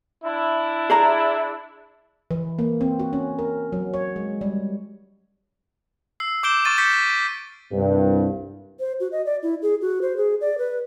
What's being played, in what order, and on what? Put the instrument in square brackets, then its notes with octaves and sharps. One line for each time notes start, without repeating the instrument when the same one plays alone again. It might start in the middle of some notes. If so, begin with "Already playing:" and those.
[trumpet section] D4 E4
[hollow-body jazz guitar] G#4 D5 A#5
[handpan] E3
A#3
C4
F#4
C#4
A#4
F#3
C#5
G#3
G3
[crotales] E6 C7
D6 E6 G6 D7 E7 G7
C#6 F6 A6 D#7
D6 G6 B6 C#7
D7
[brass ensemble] C2 G2
[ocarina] C5
F#4
D#5
D5
E4
G#4
F#4
C5
G#4
D5
B4